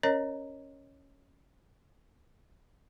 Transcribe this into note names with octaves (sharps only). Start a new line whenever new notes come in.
C#4 A#4 C#5 D#5 A#5